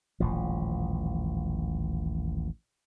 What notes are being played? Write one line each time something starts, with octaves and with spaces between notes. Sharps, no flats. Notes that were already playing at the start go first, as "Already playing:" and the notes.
D#1 A1 F3